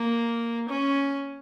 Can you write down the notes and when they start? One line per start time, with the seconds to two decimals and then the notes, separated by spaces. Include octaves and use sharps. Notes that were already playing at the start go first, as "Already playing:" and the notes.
Already playing: A#3
0.69 C#4